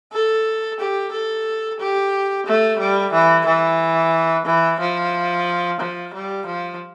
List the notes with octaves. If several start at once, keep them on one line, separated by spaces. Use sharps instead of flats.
A4
G4
A4
G4
A3
G3
E3
E3
E3
F3
F3
G3
F3